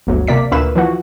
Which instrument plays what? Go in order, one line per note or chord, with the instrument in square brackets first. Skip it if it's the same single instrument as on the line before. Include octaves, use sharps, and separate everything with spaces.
[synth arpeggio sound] G1 D2 F#3
C3 A#3 D5 B6
D2 A#2 A#3 B4 E5 E7
E3 F3 F#4